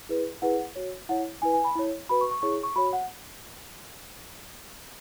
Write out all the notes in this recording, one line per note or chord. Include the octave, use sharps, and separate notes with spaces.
E4 G#4 B4
E4 G#4 B4 F#5
F#4 C#5
E4 C#5 F#5
E4 B4 G#5
G#5
B5
E4 C#5
F#4 B4 B5
C#6
C#6
E4 G#4 C#5 C#6
C#6
F#4 C#5 B5
F#5